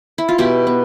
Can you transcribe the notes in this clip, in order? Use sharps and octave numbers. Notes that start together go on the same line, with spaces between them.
E4
F4
B2 E4 G4
B3